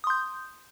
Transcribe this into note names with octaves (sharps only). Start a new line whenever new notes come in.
C6 D#6 G6